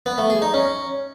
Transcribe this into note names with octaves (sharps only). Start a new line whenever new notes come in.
B3
A3
G#4
D#4
C#4